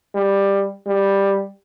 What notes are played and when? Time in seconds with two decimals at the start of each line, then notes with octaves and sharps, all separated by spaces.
0.15 G3
0.87 G3